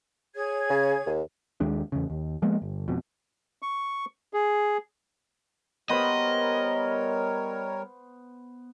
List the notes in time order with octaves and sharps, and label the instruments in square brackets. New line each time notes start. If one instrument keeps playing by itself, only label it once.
[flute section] G#4 C#5 G#6
[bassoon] C#3
D#2
[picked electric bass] D#2 G#3 D4
E2 C#3
D#2
F3 G#3 A#3 B3
G1
F2 B2
[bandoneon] C#6
G#4
[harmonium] G3 A#4 C#5 [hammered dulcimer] B3 C5 B5 [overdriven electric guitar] D#5